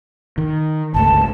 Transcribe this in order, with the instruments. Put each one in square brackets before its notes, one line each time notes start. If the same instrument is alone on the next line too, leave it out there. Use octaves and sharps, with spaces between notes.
[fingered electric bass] D#3
[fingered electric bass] G1 C#2 A3 [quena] A5